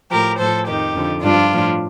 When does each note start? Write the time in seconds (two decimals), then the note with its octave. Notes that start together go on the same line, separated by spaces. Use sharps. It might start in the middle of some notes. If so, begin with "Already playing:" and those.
0.11 A2 F3 G4 A#4
0.38 A2 F3 A4 C5
0.66 F2 D#3 D#4 G4
0.95 F2 D3 F3
1.23 G2 F3 D4 F4
1.52 A2 F3